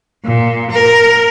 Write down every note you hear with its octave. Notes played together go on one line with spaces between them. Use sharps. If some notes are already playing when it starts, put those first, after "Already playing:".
A#2
A#4